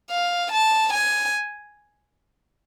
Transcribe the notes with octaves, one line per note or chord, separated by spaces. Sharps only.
F5
A5
G#5